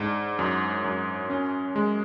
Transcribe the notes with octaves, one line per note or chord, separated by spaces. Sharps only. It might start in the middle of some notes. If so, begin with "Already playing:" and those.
Already playing: G#2 D4
F#2
F#2
C#4
G#3